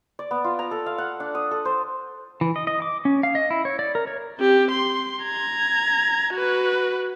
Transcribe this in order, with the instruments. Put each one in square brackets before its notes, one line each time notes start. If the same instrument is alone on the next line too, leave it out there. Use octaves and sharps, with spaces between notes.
[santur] D5
B3
F4
A#5
A4
F5
F#5
D4
D#6
A4
C5
[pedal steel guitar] E3
D#5
D#5
D6
C#4
F5
D#5
E4
C#5
D5
A#4
C#5
[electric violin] C4 G4
C6
A#5 G#6
F#4 B4